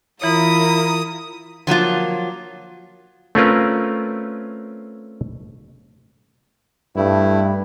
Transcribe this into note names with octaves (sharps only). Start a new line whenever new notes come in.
E3 E4 F4 A#4 C#5 D#6
F3 F#3 A#3 F4
A3 C4 C#4 F4 A#4 B4
G2 A3 E4